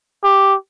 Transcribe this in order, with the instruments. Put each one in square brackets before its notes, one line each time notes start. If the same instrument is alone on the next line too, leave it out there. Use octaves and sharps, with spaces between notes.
[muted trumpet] G4